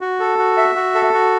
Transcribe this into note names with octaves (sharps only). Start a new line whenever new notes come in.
F#4
A4
F#4
E5
F#4
A4
F#4